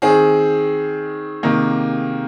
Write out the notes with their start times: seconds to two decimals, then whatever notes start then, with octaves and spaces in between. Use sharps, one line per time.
0.02 D#3 C4 G#4
1.43 C3 D#3 A#3